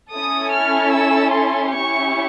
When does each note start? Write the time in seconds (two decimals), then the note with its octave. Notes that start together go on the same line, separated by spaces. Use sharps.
0.12 C#4 E4 A4 D#6
0.53 F6
0.94 E6
1.34 C6
1.75 C#4 E4 G4 C#6